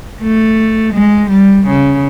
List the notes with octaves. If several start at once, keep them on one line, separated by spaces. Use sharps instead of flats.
A3
G#3
G3
C#3